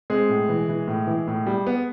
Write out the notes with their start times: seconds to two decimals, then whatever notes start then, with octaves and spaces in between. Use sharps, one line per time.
0.10 G#3 C4 G#4
0.29 A2
0.49 E3
0.69 E3
0.87 A2
1.07 E3
1.27 A2
1.46 G3
1.67 B3